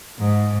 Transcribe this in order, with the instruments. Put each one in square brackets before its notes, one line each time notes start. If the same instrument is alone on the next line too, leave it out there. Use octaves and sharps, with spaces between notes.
[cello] G#2